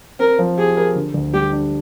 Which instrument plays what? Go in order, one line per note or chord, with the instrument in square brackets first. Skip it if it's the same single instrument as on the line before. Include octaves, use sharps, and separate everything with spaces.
[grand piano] C4 [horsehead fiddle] A#4
[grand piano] F3
[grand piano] G4 [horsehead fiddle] G#4
[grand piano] A#4
D3
D2
[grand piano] G3 [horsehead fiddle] G4
[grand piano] D4